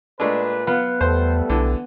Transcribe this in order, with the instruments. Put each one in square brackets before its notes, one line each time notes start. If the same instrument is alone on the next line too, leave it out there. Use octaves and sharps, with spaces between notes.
[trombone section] A#2 B4 [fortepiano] G#3 A3 D4
[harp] B3 [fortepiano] F4
[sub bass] E2 [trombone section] G3 A3 A4 [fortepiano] C5
[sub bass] B1 [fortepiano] D3 E3